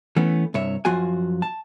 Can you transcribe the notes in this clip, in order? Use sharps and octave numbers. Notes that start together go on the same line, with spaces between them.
E3 A3 B3 C#4
C2 G2 C#5 E5
F#2 F3 F4 F#4 G#5
A5